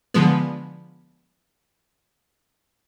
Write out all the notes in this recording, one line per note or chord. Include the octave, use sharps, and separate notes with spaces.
D3 F3 G#3 B3